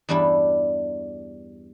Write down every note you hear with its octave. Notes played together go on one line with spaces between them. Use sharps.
E2 G2 G3 D4 E4